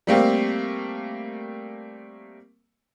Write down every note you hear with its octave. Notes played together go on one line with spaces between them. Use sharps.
G3 A3 A#3 C4